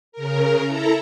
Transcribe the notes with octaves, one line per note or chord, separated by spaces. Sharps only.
C#3 A#4
E4 A4 A#5